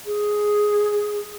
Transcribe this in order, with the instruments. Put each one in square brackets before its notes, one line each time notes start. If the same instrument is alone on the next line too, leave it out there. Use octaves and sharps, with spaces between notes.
[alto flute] G#4